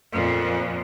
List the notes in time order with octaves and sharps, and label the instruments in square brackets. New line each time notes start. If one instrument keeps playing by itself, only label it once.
[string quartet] F2 A#2